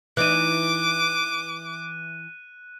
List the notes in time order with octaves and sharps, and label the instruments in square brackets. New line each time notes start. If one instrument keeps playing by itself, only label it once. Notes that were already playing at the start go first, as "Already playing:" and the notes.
[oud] E3 D#4 [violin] D6 [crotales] F#6 D#7